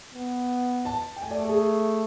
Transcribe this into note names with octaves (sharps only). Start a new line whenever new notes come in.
B3
A5
G5
A3 G#5
D5
A4
G#4